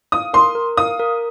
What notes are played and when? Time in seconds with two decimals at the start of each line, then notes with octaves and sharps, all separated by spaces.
0.12 F5 D#6
0.33 A#4 C6
0.55 A#4
0.77 F5 D#6
0.99 A#4